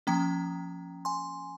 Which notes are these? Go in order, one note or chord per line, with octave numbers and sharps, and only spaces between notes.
F3 A#3 C#4 G5 A#5
G#5 C6